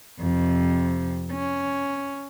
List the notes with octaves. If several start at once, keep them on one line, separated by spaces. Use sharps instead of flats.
F2 C3
C#4